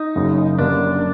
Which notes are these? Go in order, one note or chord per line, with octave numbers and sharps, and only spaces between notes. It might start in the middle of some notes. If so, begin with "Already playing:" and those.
Already playing: D#4
F#1 F#2 C#3 F#3
F#2 D3 G3 A#3 C#4 D4